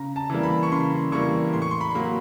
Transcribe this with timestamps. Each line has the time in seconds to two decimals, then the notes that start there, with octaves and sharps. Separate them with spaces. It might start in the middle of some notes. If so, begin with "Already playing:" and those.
Already playing: C#3 A#5
0.16 A5
0.30 E3 G3 A#3
0.43 B5
0.63 C#6
0.72 C#3 C6
1.12 E3 G3 A#3 C#6
1.53 A2 C6
1.62 C#6
1.71 C6
1.81 B5
1.95 F#3 A#3